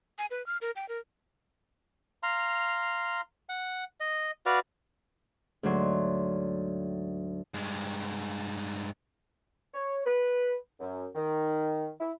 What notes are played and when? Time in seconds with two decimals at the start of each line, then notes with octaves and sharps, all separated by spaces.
0.18 G#5
0.31 B4
0.47 F6
0.61 A#4
0.76 G5
0.89 A#4
2.23 F5 A#5 C6
3.49 F#5
4.00 D#5
4.46 F#4 B4 D5 F5
5.63 D2 G#2 F#3 C6
7.54 G2 G#3
9.74 C#5
10.06 B4
10.80 F#2
11.15 D#3
12.00 E4